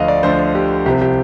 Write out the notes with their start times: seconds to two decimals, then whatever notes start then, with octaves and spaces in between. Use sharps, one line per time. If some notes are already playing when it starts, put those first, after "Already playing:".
Already playing: D2 D3 F3 D#5 F5
0.08 D5
0.23 D2 D3 F3 C5
0.55 G4
0.86 C2 C3 F3 G4
1.01 G4